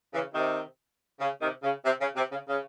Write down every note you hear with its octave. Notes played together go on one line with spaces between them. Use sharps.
C#3 E3
C3 D#3
C#3
C3 D#3
C#3
C3
C#3
C3
C#3
C#3